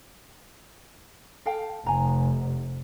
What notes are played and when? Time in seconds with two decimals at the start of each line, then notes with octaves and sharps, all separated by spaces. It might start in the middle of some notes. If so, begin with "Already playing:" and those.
1.45 A4 F5 G5
1.86 F1 G#5 A#5